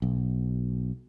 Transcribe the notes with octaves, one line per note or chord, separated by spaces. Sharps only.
B1